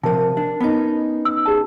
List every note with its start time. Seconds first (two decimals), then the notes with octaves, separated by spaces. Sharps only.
0.03 C3 F3 A#4 A5
0.37 D4
0.60 B3 C#4 D#4
1.25 E6
1.46 G4 G#4 A5